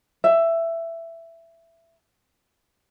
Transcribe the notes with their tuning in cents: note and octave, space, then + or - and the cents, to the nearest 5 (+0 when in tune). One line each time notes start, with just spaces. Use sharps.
E5 +10